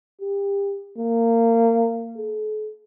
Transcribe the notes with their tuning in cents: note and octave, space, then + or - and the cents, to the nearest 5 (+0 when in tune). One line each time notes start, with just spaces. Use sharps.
G4 +30
A#3 -25
A4 -45